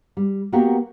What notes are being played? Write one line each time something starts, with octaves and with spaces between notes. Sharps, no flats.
G3
A#3 B3 F#4 G4 A#4